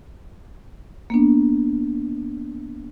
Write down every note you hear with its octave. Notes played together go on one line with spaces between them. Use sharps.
A#3 B3 D4